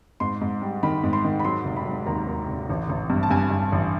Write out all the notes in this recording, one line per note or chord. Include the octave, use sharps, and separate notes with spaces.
G#2 C6
G#2
G3
D#3 B5
G#2
C6
D#3
B5
F#3 C6
F1
B5
F#3
D#2 A#5
D#2
F1
A1
A1
G2
A5
G2 G#5
G2
A1